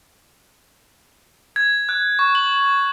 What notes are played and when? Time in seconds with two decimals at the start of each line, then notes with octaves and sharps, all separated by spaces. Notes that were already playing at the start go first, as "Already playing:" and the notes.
1.56 G#6
1.89 F#6
2.19 C#6
2.35 F#7